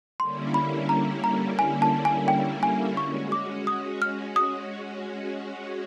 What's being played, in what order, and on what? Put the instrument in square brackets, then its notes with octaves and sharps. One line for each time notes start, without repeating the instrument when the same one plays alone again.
[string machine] D3 G3 A#3 C#4 E4 [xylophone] C6
[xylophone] B5
A#5
A#5
G#5
A5
G#5
G5
G#5
[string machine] G#3 C#4 F#4 [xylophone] C#6
[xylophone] D6
D#6
F6
D#6